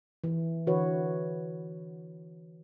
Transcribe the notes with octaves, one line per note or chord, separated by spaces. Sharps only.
E3
D3 E3 F#4 B4 C#5